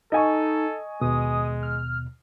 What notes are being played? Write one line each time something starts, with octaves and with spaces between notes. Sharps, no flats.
D#4 A4 D#5 G#5 C#6
D#2 B2 G#3 D#6
F6